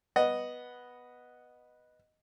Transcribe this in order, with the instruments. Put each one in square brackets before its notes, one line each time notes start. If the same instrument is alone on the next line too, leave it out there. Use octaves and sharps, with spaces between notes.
[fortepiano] B3 D#5 F#5